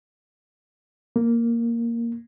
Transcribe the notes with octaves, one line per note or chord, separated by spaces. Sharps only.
A#3